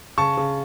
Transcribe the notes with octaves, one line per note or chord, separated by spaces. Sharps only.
C#3 A5 C#6
C#3